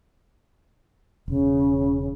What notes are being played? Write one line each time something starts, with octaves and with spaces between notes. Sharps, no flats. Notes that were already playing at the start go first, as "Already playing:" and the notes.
E1 C#3